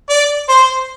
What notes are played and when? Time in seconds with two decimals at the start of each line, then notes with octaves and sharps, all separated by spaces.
0.10 D5
0.49 C5